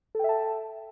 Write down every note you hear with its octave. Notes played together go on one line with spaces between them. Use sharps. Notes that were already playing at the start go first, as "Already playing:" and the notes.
A4 E5 G5 A5